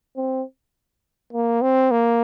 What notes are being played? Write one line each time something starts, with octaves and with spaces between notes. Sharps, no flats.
C4
A#3
C4
A#3